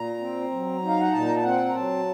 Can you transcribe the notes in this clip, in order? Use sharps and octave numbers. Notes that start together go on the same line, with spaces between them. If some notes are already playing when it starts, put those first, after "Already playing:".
Already playing: A#2 A#5
C4
F#3
D#4
F5
F#5
A#2 A5
A#5
A5
C4 F#5
A#5
F#3 A5